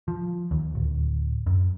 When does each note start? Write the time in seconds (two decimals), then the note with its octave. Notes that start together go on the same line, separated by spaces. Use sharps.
0.08 F3
0.51 D#2
0.75 D1
1.47 F#2